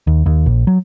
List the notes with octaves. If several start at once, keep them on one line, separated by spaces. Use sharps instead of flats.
D#2
D#2
A#1
F#3